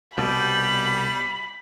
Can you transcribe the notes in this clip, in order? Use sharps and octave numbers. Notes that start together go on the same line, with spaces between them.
C2 B2 G3 G5 B5